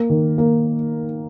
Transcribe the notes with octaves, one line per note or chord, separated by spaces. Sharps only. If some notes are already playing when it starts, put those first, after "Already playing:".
Already playing: A#3
D#3
A#3